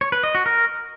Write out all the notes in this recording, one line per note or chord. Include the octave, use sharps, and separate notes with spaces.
C#5
B4
D#5
F#4
A#4